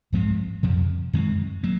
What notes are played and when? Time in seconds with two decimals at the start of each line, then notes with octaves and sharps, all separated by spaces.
0.13 G#2 F3 G#3 C4
0.63 F2 C3 F3
1.13 F#2 D#3 G#3 C4
1.63 F#3 A#3